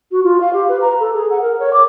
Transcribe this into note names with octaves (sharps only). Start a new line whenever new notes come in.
F#4
F4
F5
G4
B4
A#5
A4
G#4
F#5
A#4
C#5
D6